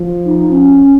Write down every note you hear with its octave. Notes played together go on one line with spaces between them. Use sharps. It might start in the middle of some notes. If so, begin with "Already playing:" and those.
Already playing: F3
D#4
C#4